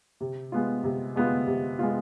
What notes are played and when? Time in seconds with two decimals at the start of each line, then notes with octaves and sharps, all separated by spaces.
0.20 C3
0.52 G#3 B3 F4
0.84 C3
1.16 G#3 B3 F4
1.47 C3
1.79 G#3 B3 F4